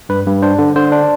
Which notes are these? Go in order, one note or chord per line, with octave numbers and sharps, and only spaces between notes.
G2 B4
G2
D4 C5
D3
D3 C5
D4